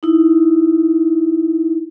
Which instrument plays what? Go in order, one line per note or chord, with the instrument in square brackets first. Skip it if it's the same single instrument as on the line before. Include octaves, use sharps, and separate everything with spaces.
[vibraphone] D#4 E4